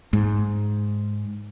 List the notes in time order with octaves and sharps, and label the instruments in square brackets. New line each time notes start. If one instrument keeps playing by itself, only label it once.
[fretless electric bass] G#2